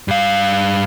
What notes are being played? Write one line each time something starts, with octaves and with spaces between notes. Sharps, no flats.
G2 F5